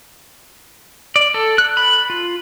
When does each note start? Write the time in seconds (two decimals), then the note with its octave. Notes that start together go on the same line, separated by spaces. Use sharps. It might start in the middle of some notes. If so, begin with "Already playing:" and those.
1.16 D5
1.34 A4
1.58 F#6
1.77 B5
2.10 F4